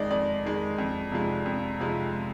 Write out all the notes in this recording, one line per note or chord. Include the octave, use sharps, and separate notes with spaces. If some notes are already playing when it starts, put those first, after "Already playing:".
Already playing: F2 D#3 G#3 D5 D#5
F2 D5
D#3 G#3
F2
C3 F3 G#3
F2
C3 F3 G#3